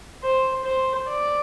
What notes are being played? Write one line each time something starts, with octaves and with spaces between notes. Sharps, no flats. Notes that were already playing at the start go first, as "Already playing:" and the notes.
C5
C5
D5